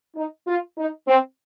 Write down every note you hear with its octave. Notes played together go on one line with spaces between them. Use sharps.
D#4
F4
D#4
C4